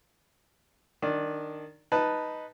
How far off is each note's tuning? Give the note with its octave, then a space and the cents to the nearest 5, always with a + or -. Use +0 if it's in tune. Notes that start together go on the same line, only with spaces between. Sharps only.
D#3 -15 D4 +0
D#4 +0 B4 +0 A5 +0